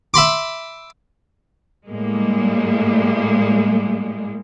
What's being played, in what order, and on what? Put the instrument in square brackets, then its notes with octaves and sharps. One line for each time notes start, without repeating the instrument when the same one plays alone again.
[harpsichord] E5 B5 C6 D6
[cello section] A2 G3 G#3 A#3